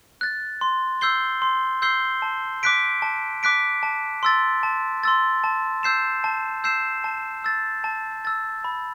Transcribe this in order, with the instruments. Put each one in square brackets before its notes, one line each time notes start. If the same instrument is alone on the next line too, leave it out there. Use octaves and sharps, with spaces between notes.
[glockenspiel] F#6 A6
C6
E6 G6 C7 G7
C6
E6 G6 C7 G7
A5
D6 F#6 B6 D7
A5
D6 F#6 B6 D7
A5
C6 E6 A6
A5
C6 E6 A6
A5
E6 G6 C7 E7
A5
E6 G6 C7 E7
A5
E6 A6
A5
E6 A6
B5